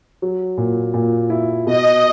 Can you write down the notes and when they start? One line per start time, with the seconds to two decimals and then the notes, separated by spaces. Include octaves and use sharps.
0.22 F#3
0.58 A#2
0.94 A#2
1.30 E4
1.66 B2 D#5